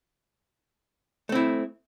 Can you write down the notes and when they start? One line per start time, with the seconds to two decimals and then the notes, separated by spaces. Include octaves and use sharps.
1.29 A3
1.32 C4
1.35 E4